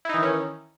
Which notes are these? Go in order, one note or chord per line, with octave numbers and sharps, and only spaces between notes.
D#3 E3 C#4 D#4 E4